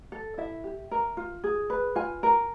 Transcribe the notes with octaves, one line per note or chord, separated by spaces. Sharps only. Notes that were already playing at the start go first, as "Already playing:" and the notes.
A4
E4 E5
G4
A#4
F4
G#4
B4
F4 G#5
A#4